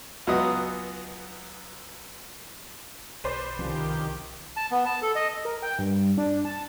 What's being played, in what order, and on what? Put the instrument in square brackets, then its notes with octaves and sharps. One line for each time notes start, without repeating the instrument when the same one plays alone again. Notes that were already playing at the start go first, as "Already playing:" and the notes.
[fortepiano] C#2 F#3 B3 D#5 D#6
[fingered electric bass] B1 [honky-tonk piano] B4 C5 D5
[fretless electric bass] C2 F3 C#4 [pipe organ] D#3 G4
[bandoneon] A5
B3
A5
A4
D#5
[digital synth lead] A#4
G5
G2
D4
A5